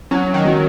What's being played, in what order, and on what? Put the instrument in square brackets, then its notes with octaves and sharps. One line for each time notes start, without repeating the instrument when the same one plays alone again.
[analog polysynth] F#3 [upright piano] C#4
[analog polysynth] D#3
[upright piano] F#3